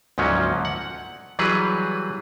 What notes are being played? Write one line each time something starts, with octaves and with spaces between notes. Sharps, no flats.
D2 G#2 F3 F#3 A#3 C#4
F#5
E3 F#3 G3 G#4 B4